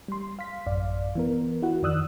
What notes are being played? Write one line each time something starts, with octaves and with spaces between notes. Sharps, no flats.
G3 C6
F5 B6
A1 F#2 D5 F5
E3 B3 A#4
E4 F#4 F#5
F2 D#3 D5 D#6 E6 F#6